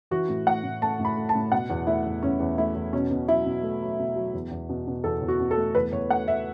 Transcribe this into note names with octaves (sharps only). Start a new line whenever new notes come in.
E3 F#4
A2
A3 F#5
A2
A3 A5
A2
B5
A3
A5
A2
B2 F#5
E2
A3 E4
E2
E2 C#4
E2
A3 E4
E2
B2 C#4
B2
F#3 E4
B2
A3
F#3
B2
F#3
E2
E2
B2
B2
E2 A4
E2
F#4
B2
A4
A3
E2 B4
E2 C#5
A3 F#5
A3 E5